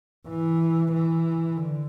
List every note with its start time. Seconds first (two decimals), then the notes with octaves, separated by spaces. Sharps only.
0.29 E3
0.93 E3
1.57 D3